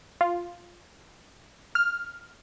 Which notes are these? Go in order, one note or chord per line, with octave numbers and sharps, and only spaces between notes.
F4
F6